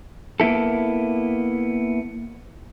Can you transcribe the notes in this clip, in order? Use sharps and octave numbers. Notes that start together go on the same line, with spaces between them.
A#3 B3 E4 A4